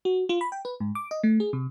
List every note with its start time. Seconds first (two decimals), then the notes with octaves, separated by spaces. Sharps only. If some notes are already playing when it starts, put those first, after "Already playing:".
0.05 F#4
0.29 F4
0.41 B5
0.52 G5
0.65 B4
0.80 G#2
0.95 D6
1.11 D#5
1.23 A3
1.40 G#4
1.53 C3